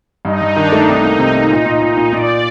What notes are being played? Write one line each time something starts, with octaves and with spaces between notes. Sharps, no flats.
G2 D#4
G2
D#3 D4
A3
C2 D#4
A#3
C3
A#3
A#2
A#2
A#2 D#4
A#2
A#2 D5